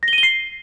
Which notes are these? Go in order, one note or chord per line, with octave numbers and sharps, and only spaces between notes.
A#6
G7
D#7
G7
C7